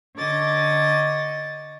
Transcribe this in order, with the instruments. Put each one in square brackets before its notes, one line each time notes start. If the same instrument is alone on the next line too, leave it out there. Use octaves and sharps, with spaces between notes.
[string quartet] D3 C#5 D#5 D6 A6